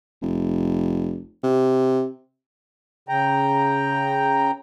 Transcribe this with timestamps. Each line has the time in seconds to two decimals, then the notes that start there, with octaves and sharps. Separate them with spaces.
0.22 F1
1.43 C3
3.09 C#3 G5 A#5